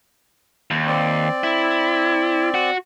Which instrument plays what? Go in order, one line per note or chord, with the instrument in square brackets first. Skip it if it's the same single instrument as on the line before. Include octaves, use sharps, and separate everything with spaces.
[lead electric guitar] D#2
[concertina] C4 D5
[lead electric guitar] E4
F#4